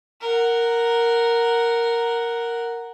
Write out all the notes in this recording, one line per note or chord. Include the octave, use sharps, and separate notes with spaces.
A#4 F#5